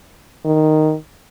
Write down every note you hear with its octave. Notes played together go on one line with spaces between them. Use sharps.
D#3